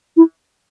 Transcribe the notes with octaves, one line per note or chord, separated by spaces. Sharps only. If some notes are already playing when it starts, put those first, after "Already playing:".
E4